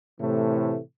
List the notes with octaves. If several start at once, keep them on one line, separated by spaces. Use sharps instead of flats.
A2 C3 E3 A3